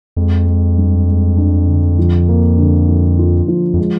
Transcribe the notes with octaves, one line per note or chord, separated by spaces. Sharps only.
F2 G#3
G#3
G2
G#3
D4
D3
F3
A#3
D3
F3
F4
F3
F2
G#3